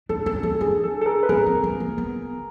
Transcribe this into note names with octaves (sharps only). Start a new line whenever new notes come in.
D4 A4
C#4 A4
C#4 A4
D4 G#4
A4
A4
G#4 A#4
B4
C#4 G#4 A#4
C4
A#3
A#3
B3